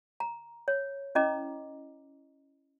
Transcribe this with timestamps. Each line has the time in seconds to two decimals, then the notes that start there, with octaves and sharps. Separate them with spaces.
0.20 A#5
0.68 C#5
1.15 C#4 E4 D#5 A#5 D6